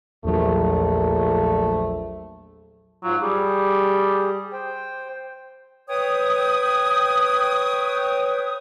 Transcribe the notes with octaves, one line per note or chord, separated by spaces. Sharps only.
A#1 E2 F#3 A3
G#2 F#3 F4
G3 G4 G#4
C5 G5
B4 C#5 G5 D#6